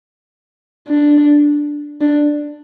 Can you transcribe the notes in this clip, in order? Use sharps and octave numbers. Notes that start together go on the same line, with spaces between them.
D4
D4